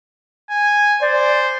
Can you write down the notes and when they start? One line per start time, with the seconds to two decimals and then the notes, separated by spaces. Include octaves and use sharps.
0.50 G#5
1.02 C5 D5